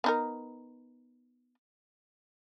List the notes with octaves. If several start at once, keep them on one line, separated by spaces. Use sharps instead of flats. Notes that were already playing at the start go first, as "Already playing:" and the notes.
B3 D#4 A#4